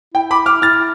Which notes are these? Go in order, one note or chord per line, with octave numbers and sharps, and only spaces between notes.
E4 G5
B5 D6
D6 F6
E4 F6 A6